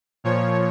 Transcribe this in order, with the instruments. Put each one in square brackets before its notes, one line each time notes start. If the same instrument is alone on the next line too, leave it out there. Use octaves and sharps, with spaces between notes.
[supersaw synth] A#2 F3 C#5